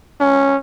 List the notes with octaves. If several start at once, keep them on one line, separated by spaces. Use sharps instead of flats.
C#4